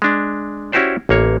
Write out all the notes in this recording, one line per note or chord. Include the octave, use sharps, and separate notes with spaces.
G#3 D4
C#4 E4 F#4 G4 C5 D5
A1 A#3 C#5